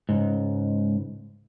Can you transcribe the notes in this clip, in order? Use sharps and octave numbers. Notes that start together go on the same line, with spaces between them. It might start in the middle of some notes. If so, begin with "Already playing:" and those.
C#2 G#2